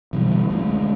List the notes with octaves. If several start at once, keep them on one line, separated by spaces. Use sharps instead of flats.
B2 D3 E3 G3
D2 G3 G#3